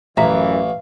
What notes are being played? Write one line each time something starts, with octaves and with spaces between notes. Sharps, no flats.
A1 F#2 E3 E5 F5 A#5 B6